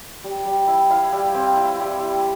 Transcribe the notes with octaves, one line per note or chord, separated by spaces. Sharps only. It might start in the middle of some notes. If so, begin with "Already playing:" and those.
G3
G3
E4
E4 F5
G3
C4
E4
G3
E4